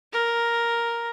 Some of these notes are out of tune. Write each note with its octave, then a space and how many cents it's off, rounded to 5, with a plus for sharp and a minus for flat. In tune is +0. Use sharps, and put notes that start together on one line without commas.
A#4 +5